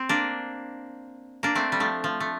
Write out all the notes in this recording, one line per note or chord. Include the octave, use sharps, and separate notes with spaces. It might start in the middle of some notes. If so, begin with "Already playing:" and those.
Already playing: C4
A#3 D4
A#3 D4
A3 C4
G3
F3 A3
F3
A3